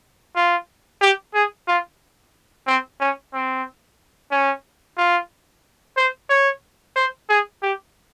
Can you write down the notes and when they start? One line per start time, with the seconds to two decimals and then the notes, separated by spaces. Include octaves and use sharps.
0.36 F4
1.01 G4
1.34 G#4
1.68 F4
2.67 C4
3.00 C#4
3.33 C4
4.32 C#4
4.98 F4
5.97 C5
6.30 C#5
6.96 C5
7.29 G#4
7.62 G4